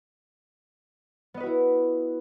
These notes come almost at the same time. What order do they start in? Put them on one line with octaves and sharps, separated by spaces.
B3 D#5 B4 F#4 E4